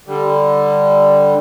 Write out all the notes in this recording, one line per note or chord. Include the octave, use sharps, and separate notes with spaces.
D3 G3